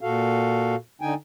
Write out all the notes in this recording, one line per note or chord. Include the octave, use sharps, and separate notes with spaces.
A#2 F#4 A4 F5
D3 D#4 G5 G#5